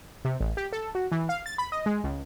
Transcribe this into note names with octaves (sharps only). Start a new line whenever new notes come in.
C3
A1
G4
A4
F#4
E3
F5
A6
B5
D#5
G#3
C#2